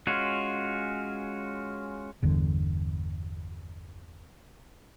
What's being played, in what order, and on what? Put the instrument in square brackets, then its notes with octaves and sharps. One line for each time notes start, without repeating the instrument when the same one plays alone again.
[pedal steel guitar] G#3 C#4 F4 F#4
[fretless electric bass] G1 E2 D3